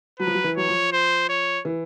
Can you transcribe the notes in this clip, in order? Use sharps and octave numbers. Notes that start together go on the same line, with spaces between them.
F#3 B4
F3
F#3
E3
F#3 C#5
F3
C5
C#5
E3